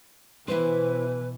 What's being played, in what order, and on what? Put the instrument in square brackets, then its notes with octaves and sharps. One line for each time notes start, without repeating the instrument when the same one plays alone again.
[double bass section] B2 E3 [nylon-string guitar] E4 C5 [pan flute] B4